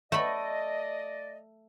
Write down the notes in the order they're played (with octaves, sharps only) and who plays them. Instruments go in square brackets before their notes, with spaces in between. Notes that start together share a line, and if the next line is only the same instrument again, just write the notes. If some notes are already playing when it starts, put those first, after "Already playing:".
[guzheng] A3 B5 [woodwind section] D5 D#5